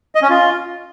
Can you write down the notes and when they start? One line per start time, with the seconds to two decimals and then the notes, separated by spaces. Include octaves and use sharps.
0.15 D#5
0.22 C#4
0.30 F4